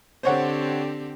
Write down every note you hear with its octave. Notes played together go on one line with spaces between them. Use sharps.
D3 C4 G4 C5 C#5 F#5